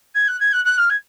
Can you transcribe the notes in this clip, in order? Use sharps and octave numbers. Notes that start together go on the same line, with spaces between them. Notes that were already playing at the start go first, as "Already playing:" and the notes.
G#6
F#6
G#6
F#6
F#6
F6
G#6